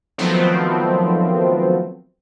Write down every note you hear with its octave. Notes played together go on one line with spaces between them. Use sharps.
D#3 F3 F#3 A3 B3 C4